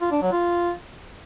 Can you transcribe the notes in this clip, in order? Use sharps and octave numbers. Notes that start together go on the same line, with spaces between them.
F4
D4
F#3
F4